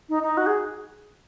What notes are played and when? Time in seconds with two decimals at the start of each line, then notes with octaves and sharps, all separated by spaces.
0.09 D#4
0.23 D#4
0.37 F#4
0.47 G#4